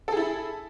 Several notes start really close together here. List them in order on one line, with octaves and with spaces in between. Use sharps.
A4 G#4 E4